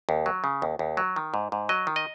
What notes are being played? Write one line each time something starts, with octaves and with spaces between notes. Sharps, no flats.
D#2
F#3
C#3
D#2
D#2
F#3
D#3
G#2
G#2
F#3 D#5
D#3
D#5